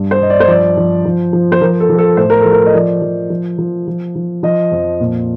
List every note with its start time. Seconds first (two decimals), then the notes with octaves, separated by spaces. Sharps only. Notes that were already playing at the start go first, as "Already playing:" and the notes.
Already playing: G2
0.11 C5
0.21 G2 D#5
0.30 D5
0.40 C5
0.48 F3 D5
0.77 F3
1.05 F3
1.33 F3
1.52 C5
1.61 F3 A#4
1.80 A4
1.90 F3
1.98 A4
2.17 A2 C5
2.30 A#4
2.41 F3 A4
2.53 A#4
2.66 D#5
2.74 F3 D5
3.02 F3
3.30 F3
3.58 F3
3.88 F3
4.15 F3
4.43 F3 D#5
4.72 F2
5.00 A#2